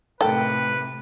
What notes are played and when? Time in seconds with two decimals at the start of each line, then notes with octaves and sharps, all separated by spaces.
0.21 A2 C3 D#3 A4 B4 G5